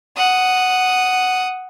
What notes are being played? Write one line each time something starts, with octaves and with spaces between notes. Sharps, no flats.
F#5 D#6